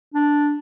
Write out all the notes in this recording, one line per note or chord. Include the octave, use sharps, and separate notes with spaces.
D4